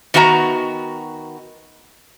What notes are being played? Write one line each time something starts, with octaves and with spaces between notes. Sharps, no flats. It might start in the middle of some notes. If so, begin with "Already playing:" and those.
D#3 B3 F#4 E5 A#5